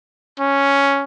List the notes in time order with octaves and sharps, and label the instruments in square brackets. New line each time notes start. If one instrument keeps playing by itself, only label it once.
[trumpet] C#4